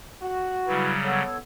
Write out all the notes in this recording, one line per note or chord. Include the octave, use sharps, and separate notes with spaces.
F#4
C#3 F#3 G3 E4 B4
B3 A4 C#5